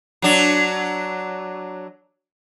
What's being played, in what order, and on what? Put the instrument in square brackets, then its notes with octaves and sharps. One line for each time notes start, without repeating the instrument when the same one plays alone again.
[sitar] F#3 D4